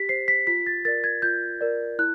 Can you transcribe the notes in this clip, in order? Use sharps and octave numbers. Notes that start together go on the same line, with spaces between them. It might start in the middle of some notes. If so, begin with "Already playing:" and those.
Already playing: G4 B6
C5 C7
B6
F4 B6
A6
A#4 D5 A6
G#6
F4 G6
A#4 D5
E4 F#6